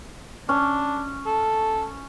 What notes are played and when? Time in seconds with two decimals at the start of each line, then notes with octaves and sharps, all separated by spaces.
0.49 C#4 D4
1.26 A4